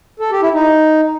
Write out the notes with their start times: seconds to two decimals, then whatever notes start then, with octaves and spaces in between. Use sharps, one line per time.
0.20 A4
0.31 G4
0.42 E4
0.53 D#4